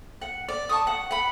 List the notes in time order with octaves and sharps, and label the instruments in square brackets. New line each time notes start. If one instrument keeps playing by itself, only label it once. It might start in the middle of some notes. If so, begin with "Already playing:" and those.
[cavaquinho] F#5
D5
A5 C#6 D#6
F#5
F#5 B5